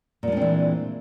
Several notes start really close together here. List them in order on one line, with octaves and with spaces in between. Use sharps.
A#2 G#3 D4 C4 E3